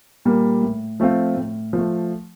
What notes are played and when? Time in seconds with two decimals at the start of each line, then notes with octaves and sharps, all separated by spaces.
0.25 A#2 G3 A#3
0.63 A2
1.00 F3 A3 C4 F4
1.36 A2
1.73 F3
1.78 A3